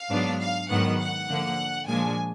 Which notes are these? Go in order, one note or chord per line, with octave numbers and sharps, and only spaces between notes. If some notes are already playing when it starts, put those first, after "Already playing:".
Already playing: F5
G#2 F#3 B3 D4
F5
G#2 D#3 F#3 B3 F#5
F#5
D3 F3 A#3
A#2 F3 G#3 D4 G#5